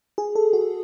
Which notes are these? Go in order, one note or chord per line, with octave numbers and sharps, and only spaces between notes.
G#4
A4
F#4